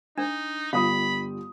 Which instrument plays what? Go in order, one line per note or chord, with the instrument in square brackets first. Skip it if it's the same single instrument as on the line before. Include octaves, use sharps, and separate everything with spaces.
[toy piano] D4 [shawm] D#4
[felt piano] G1 G3 D#6 [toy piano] F4 F5 [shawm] B5